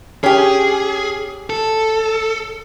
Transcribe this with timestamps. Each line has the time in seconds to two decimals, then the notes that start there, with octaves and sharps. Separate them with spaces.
0.24 C#4 G4 G#4
1.50 A4